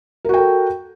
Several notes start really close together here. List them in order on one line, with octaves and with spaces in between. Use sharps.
A#4 F#4 G5 A4